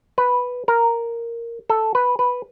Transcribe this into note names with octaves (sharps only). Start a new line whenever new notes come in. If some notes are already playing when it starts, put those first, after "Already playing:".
B4
A#4
A4
B4
B4